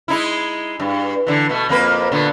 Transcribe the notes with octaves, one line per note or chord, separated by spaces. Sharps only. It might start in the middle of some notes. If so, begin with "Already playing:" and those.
G#3 D#4 E4
G2
D3 E3
B2 A3
F2 A#3 B4
A#2 D3 B3